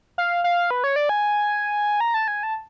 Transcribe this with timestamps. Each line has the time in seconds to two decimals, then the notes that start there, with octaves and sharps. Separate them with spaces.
0.18 F5
0.44 F5
0.71 B4
0.84 C#5
0.96 D5
1.09 G#5
2.01 A#5
2.14 A5
2.28 G#5
2.43 A5